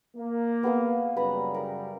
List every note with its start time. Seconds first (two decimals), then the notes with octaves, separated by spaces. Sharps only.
0.16 A#3
0.63 B3 G#4 F5
1.16 F#2 C#3 G3 B4 A#5 B5
1.54 A#4